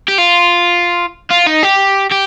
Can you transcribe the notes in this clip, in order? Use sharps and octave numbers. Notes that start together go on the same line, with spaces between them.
G4
F4
F4
D#4
G4
G4